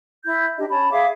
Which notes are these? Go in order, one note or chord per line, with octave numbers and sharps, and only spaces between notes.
E4 G6
D4 D#4 G4 D#5
C#4 C#5 A5 B5
G#4 E5 F5 D6